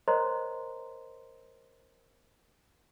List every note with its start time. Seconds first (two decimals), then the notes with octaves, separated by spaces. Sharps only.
0.08 A#4 C5 C#5 D#5 A#5 C6